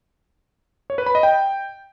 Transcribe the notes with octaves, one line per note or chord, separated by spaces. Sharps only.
C#5
B4
B5
D#5
G5